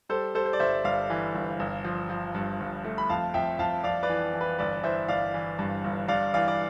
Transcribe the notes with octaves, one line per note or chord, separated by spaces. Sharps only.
G3 A4 C5
G3 A4 C5
C5
D5
G1 C5 E5
G1 D5 F5
E3
G1
G1
F3
F3
G2
G1
A3
B5
F2 F5 A5
F2 E5 G5
F2 F5 A5
F2 D5 F5
B4 D5
E3
E3
B4
G1 B4 D5
E3 C5 E5
G1 D5 F5
E3
G2
G1
G2 D5 F5
E3 D5 F5
D5